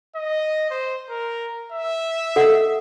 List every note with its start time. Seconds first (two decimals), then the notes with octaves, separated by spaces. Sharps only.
0.15 D#5
0.70 C5
1.10 A#4
1.72 E5
2.36 A4 F#5